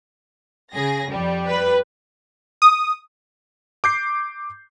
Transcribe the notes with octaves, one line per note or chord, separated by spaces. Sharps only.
C#3 G#4 A#6
F2 G3
B4
D#6
D6 G6 C7